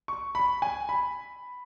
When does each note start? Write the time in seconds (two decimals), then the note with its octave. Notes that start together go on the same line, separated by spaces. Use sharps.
0.08 C#6
0.35 B5
0.62 G#5
0.89 B5